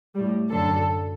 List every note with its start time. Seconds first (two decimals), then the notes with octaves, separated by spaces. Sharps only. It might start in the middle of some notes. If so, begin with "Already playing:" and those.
0.14 A2 G3
0.50 F#2 D3 F#3 A4